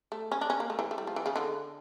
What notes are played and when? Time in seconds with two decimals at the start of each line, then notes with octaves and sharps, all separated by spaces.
0.12 A3
0.32 C#4
0.41 D4
0.50 C#4
0.60 A#3
0.70 A3
0.79 E3
0.91 A3
0.98 G3
1.07 F3
1.16 E3
1.26 C#3
1.36 D3